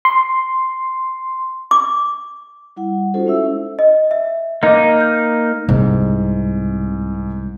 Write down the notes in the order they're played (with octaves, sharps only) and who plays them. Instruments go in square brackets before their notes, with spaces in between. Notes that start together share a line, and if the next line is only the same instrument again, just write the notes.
[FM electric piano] C6
[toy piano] D6
[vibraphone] G3 E4 F#5
C#4 D#4 F4 F#4 A4 C5
G#3 C#4 E4 E5 E6
[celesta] D#5
E5
[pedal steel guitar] A#3 D#4 [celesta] D#5 D6
[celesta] G6
[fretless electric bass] C2 [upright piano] G#2 [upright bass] C3